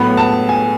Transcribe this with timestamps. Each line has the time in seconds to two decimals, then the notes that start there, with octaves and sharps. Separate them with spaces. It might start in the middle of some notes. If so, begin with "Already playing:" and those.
Already playing: A2 F#3 B3 B5
0.17 A5
0.49 G#5